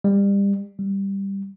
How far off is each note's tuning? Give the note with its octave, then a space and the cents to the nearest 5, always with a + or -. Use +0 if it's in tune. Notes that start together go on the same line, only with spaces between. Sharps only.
G3 +30
G3 +5